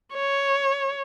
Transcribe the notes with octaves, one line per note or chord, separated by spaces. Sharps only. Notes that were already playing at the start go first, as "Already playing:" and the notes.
C#5